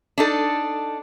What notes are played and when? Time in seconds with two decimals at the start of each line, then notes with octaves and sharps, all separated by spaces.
0.18 D4 D#4 A4